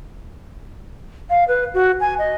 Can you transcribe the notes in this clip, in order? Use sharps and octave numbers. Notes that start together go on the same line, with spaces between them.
F5
B4
F#4
G#5
D#5